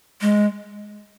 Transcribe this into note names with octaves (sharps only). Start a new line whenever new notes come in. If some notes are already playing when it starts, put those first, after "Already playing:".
G#3